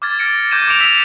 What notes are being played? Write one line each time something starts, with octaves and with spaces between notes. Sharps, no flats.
D6 F6 G#6 A6
F6 A6 A#6 C#7 D7
D6 G6 G#6 A#6 D#7 E7
D6 A6 C#7 D7 F7
E6 B6 C#7